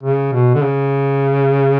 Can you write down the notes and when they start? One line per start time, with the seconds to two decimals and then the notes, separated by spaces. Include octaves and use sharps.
0.03 C#3
0.33 B2
0.55 D3
0.63 C#3